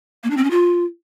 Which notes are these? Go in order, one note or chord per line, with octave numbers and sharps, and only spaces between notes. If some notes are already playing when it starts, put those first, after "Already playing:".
A#3
D4
C4
C#4
F4